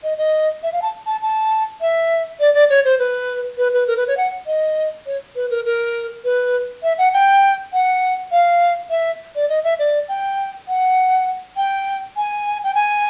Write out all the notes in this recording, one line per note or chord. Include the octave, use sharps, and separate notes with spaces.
D#5
D#5
E5
F5
A5
A5
A5
E5
D5
D5
C#5
C5
B4
B4
B4
A#4
B4
C#5
F#5
D#5
C#5
B4
A#4
A#4
B4
E5
F#5
G5
F#5
F5
E5
D5
D#5
E5
D5
G5
F#5
G5
G#5
G5
G#5